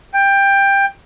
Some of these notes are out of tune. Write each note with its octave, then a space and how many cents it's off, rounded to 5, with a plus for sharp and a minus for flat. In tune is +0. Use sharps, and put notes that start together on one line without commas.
G5 +15